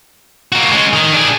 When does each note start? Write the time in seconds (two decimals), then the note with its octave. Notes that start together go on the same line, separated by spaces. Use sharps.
0.52 A#3 F#4
0.71 G#3 C#4
0.93 D#3
1.13 D4 G#4